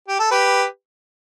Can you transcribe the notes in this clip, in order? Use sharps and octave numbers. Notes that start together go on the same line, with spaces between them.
G4
A4
G4 B4